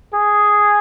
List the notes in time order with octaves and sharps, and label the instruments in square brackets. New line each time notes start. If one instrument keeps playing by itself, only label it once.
[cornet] G#4